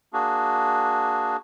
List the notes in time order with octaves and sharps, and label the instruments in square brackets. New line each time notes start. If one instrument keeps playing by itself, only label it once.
[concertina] A#3 D4 F#4 G#4